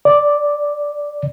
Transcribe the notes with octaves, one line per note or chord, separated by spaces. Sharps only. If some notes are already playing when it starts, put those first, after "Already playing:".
D5